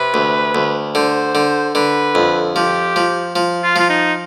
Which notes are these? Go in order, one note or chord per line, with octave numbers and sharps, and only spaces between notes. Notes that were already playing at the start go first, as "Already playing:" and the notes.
Already playing: C3 B4
D2
D2
D3 C5
D3
D3 B4
F2
F3 G4
F3
F3
F4
F3 F4
D#4